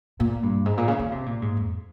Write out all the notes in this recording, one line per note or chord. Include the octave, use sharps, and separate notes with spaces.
A#2
G2
G#2
A#2
C#3
D#3
C3
A#2
G#2
F2